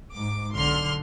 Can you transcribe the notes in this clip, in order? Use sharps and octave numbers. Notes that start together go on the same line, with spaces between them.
G#2 D6
B1 D3 C6 F6